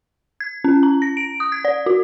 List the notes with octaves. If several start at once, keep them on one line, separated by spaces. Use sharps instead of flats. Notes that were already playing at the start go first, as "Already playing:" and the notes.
G#6
C#4
A#5
A#6
D7
D#6
G#6
D5
F#4